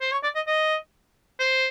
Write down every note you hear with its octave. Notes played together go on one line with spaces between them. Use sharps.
C5
C#5
D5
D#5
D#5
C5